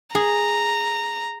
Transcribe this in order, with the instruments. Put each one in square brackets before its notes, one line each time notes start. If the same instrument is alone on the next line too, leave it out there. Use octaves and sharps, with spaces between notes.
[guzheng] G#4 [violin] A#5